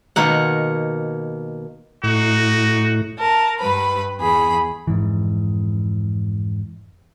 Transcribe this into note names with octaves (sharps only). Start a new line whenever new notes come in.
B2 D#3 A#3 F#5
A2 D#4 F#4
A#4 A5
G2 B4 B5
E2 G#4 B5
F2 G#2 E3